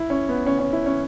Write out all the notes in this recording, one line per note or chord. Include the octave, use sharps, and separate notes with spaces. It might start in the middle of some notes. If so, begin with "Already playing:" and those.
Already playing: E4
C#4
B3
C#4
C#4
E4
C#4